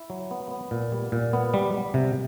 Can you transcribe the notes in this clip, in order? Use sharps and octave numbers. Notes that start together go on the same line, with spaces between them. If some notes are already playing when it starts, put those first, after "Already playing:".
Already playing: E4
F#3
B3
B3
A#2
G3
A#2
B3
G3
G3
C3